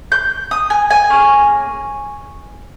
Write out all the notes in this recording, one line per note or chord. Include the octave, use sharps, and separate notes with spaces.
G6
D#6
G#5
G#5
A#3 C#4 G#4